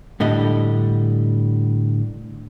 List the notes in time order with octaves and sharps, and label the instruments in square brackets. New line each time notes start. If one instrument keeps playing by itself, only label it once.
[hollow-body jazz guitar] A2 D3 G3 D#5